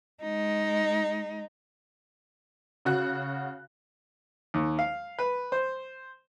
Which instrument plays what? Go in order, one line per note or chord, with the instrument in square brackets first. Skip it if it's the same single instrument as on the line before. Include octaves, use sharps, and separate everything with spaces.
[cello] G#3 D#4
[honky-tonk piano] C#3 F#4 F#6
[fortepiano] D#2
F5
B4
C5